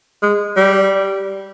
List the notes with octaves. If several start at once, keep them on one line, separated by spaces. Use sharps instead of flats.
G#3
G3